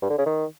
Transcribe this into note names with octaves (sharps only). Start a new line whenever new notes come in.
G2
D3
C#3
D#3